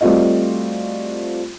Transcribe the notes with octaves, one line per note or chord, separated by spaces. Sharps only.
G3 A3 C4 F4 F#4 D#5